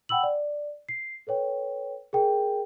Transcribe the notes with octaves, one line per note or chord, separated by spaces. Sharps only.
F#5 G5 B5 E6 F#7
D5
C7
A4 B4 C#5 G5
G#4 A#4 G5